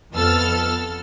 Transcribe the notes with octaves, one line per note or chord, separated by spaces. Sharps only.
F2 B3 A4 E6 F6 A6